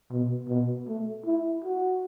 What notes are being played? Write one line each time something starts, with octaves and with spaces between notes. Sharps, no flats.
B2
B2
A3
E4
F#4